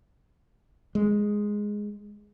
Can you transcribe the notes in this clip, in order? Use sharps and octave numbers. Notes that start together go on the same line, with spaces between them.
G#3